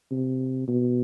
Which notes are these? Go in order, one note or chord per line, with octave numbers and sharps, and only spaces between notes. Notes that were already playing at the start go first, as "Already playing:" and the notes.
C3
B2